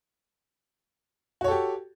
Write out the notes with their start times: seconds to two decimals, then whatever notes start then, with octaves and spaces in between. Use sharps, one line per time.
1.41 F#4
1.44 C#5
1.48 A4
1.51 G4